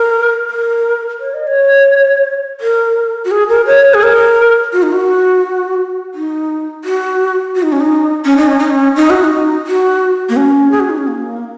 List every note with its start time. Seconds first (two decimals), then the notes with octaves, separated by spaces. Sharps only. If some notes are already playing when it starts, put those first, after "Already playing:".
Already playing: A#4
0.49 A#4
1.20 C#5
1.34 D#5
1.47 C#5
2.61 A#4
3.25 F#4
3.31 G#4
3.49 A#4
3.67 C#5
3.94 G#4
4.03 A#4
4.73 F#4
4.83 D#4
4.92 F#4
6.15 D#4
6.84 F#4
7.56 F#4
7.63 D#4
7.72 C#4
7.80 D#4
8.25 C#4
8.37 D#4
8.47 C#4
8.59 D#4
8.70 C#4
8.96 D#4
9.10 F#4
9.24 D#4
9.67 F#4
10.29 A#3
10.37 C#4
10.71 G#4
10.80 F#4
10.90 D#4
10.98 C#4
11.08 A#3